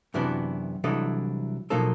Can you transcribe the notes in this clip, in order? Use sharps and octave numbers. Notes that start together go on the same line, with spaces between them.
F#2 C3 E3 B3 D4 F#4
C2 E3 F#3 D4 A4 D#5
B2 F3 F#3 A#3 D#4 A4